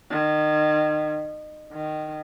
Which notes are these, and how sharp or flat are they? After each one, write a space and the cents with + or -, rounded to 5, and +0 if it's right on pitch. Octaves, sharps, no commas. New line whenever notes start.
D#3 -30
D#3 -15